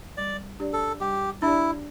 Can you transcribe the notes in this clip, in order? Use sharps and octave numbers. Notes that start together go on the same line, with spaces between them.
G3 D5
D4 G4 D5
A4
G3 G4
D4 E4 G4 D5